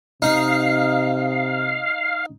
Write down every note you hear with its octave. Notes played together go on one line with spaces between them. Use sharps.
C3 D#4 F5